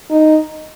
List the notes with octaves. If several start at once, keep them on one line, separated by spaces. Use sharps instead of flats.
D#4